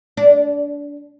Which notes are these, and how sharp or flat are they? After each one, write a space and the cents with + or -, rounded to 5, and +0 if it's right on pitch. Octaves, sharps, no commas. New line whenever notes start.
D4 -25